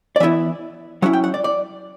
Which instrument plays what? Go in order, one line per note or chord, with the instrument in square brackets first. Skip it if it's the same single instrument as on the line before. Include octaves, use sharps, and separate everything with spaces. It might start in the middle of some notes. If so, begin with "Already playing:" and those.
[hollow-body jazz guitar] D5
E3 B3 E4 E5
F#3 C#4 E4 F#5
G5
F#5
D5
D5